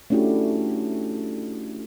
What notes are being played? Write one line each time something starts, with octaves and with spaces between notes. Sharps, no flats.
A3 C#4 D4 E4 F#4 G4